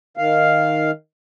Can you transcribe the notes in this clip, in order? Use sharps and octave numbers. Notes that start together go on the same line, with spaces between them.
D#3 F5